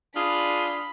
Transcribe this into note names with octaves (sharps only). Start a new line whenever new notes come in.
D4 F4 G#4 B5